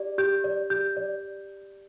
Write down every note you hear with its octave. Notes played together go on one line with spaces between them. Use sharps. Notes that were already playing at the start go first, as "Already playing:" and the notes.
Already playing: G4 D5
G4 G6
D5
G4 G6
D5